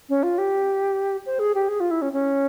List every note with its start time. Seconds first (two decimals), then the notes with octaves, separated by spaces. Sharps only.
0.09 C#4
0.23 F4
0.38 G4
1.26 C5
1.39 G#4
1.55 G4
1.68 G#4
1.80 F4
1.91 E4
2.02 C#4
2.13 C#4